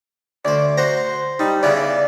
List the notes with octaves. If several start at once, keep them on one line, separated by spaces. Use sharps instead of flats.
D2 C5 D5
F#4 C5 A#5
G3 D#4
C#3 E3 B3 D5